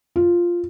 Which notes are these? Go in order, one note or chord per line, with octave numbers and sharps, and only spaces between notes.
F4